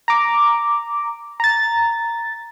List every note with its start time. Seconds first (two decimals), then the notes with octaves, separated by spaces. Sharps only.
0.08 A#5 D6
1.40 A#5 A6